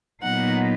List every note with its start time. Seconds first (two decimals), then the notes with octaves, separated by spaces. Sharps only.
0.22 A#2 F#3 B3 D#4 F#5